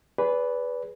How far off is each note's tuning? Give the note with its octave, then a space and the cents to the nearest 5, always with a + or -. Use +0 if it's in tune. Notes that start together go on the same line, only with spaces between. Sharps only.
G#4 +0 B4 +0 D5 -30